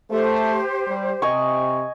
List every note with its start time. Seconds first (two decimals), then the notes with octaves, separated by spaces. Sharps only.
0.11 A3 G4 C5
0.86 G3
1.22 C3 D#5 G#5 C#6